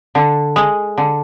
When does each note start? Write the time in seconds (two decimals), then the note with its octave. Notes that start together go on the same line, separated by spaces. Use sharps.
0.15 D3
0.56 G#3
0.98 D3